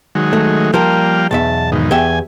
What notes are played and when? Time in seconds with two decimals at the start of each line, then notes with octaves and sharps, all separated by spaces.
0.15 D#3 F#3 G#3
0.33 A3
0.74 F3 G3 A#3 A#4 F5 G5
1.31 B1 E2 E5 A5
1.72 G#2 B2 D#3
1.91 E2 G4 E5 G#5